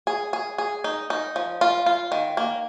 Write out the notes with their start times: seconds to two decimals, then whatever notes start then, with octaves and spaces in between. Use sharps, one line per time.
0.07 G#4
0.33 G#4
0.58 G#4
0.84 D#4
1.10 D#4
1.36 F3
1.61 F4
1.86 F4
2.12 D#3
2.37 A#3